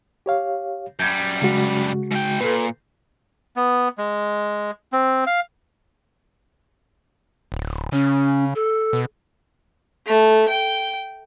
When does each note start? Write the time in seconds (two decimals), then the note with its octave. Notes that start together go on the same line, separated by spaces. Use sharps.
0.26 G4 C#5 F5
0.99 F#2 G3 G6 G#6
1.42 C#3 G#3 F#4
2.11 G#2 G5
2.41 A#2 A4 B4
3.56 B3
3.98 G#3
4.93 C4
5.27 F5
7.52 D1
7.92 C#3 C#4
8.55 A4
8.93 B2
10.06 A3
10.48 G5